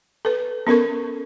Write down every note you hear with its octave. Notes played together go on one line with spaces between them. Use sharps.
A4 B4
B3 C#4 A4 A#4 C#6